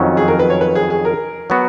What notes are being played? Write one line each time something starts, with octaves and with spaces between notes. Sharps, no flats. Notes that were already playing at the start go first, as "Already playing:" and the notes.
Already playing: F2 D#3 F#3 C#4
G#4
A#4
B4
C#5
B4
G#4
G#4
A#4
F#3 B3 F#4